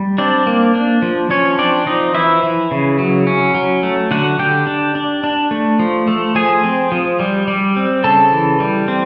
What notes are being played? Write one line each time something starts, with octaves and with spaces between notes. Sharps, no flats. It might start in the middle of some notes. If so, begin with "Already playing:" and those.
Already playing: G3
C4 D4 D5
A#3
D4
F3
F3 C#4 C#5
C4 D4 D5
F3 D#4 D#5
E3 E4 E5
E3
C#3
F#3
C#4
F#3
A3
D3 F#4 F#5
D3 G4 G5
D4
D4
D4
A3
F3
A3
F3 G#4 G#5
C4
F3
G3
G3
C4
C#3 A4 A5
E3
G3
C4